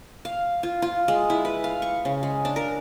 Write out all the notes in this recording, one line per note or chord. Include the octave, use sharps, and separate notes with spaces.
F5
F4
F4
G#3
E4
B4
F5
C#6
C#3
G#3
D4
A#4